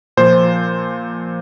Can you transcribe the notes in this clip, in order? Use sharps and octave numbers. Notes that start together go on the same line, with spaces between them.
A#2 F3 C5